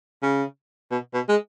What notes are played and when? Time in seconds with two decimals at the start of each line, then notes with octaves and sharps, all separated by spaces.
0.23 C#3
0.91 B2
1.14 B2
1.29 G#3